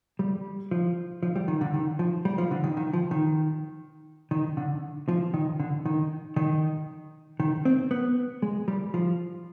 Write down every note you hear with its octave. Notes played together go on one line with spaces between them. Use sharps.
G3
F3
F3
G3
D#3
D3
D#3
F3
G3
F3
D3
D#3
D#3
F3
D#3
D#3
D3
F3
D#3
D3
D#3
D#3
D#3
C4
B3
G#3
G3
F3